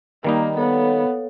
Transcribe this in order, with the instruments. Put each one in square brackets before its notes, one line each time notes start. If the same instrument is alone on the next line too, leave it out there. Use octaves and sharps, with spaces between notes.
[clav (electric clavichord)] D#3 G3 D#4 [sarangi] A#3
[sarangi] B3 [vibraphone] A4 C#5 F5